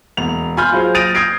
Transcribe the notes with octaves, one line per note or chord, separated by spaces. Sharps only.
E1 F7
G#5 B5 C6 F6 G6
F#3 F4 G#4 C5
D#6 A6 A#6 D7 D#7 F7
D#6 G6 G#6 C7 D7